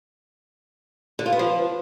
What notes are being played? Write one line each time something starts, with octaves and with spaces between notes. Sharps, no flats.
D3
F4
B3
F3